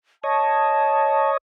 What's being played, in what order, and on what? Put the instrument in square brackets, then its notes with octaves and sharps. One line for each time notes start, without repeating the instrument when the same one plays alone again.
[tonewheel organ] C#5 D#5 [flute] A5